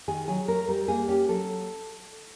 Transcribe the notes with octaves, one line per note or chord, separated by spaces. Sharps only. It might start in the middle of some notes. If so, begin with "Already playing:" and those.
D#3 G#4
F#3 G#4
A3 A#4
G3 A#4
A#3 G#4
C#4 G4
F#3 A4